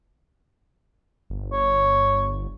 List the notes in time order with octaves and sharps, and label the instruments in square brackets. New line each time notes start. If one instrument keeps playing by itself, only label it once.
[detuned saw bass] G1
[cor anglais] C#5